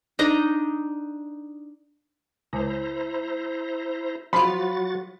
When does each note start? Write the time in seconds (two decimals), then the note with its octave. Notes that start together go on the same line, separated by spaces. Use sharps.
0.19 D4 D#4 D#5 A#5
2.53 C#2 E4 C5 A#5
4.33 F3 F#3 F4 F#4 B5 A6